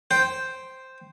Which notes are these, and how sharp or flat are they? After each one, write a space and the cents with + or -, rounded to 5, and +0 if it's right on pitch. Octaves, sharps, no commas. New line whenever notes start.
C5 +0 G5 +0